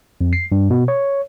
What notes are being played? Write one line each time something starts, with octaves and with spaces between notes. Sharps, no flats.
F2
C7
G2
B2
C#5